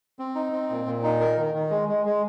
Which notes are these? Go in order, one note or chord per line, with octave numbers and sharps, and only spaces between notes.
C4
D#4
C4
A#2
A#2
D#4
A#4
D#3
D#3
G#3
G#3
G#3